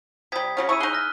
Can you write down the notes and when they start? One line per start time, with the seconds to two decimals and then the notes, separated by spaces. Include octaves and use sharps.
0.32 C3 G3 D#6 G#6 B6
0.57 C#3 F#3 C#4
0.69 C#3 E4 G#5 C#6 E6 D#7
0.80 D#4 G#4 E6 F#6 G7
0.93 F6 A#6